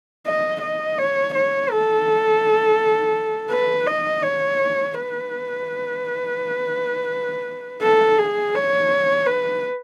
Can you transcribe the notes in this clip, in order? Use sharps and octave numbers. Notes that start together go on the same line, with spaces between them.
D#5
D#5
C#5
C#5
A4
B4
D#5
C#5
B4
A4
G#4
C#5
B4